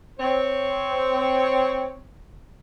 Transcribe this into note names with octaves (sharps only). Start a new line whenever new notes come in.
C4 C#5